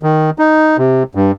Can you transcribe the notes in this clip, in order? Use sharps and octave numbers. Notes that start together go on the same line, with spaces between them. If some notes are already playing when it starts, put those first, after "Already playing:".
D#3
D#4
C3
G2